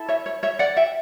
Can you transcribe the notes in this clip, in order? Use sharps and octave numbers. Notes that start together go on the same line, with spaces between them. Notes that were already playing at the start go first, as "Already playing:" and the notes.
Already playing: E4 A4
C#5 E5
C#5
C#5 E5
D5 F#5
E5 G5